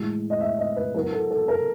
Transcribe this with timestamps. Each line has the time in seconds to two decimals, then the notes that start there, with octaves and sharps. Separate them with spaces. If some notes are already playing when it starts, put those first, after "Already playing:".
Already playing: A2 E3 G#3
0.30 D#5
0.41 E5
0.58 D#5
0.76 B4
0.94 F#3 B3 E4 A#4
1.12 A4
1.31 A4
1.48 A#4